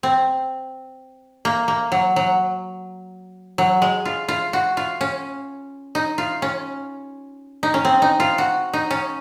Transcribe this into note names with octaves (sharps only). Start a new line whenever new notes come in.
C4
A#3
A#3
F#3
F#3
F#3
G#3
F4
F4
F#4
F4
C#4
D#4
F4
C#4
D#4
C#4
C4
D#4
F4
F#4
D#4
C#4